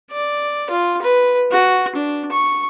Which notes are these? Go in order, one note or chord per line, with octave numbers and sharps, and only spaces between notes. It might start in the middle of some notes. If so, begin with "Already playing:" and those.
D5
F4
B4
F#4
D4
C#6